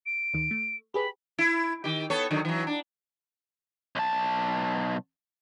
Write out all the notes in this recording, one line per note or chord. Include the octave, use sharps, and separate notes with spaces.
D7
D2 D#3
A3
G4 G#4 B4 B5
E4
D#3 G4
B3 A4 C#5
D3 D#3 F#3
E3 F#3
D4
B1 A5